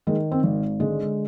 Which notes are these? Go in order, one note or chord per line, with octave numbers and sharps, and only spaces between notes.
D#3 G#3
C4
G#1
D3 G#3